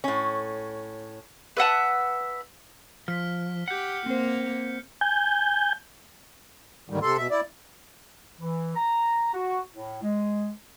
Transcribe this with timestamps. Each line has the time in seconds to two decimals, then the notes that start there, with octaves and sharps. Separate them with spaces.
0.04 A2 C#4
1.57 B4 E5 F#5 A5
3.08 F3 F6 B6
3.68 G4 F#5 G6 C#7
4.06 A#3 C4 C5
5.01 G#5 G6
6.90 D#2 G#2 D3 D#3 G3
7.02 C3 A4 C6
7.17 B2 E5
7.30 E4 D5
8.40 E3
8.76 A#5
9.34 F#4
9.73 A2
10.03 G#3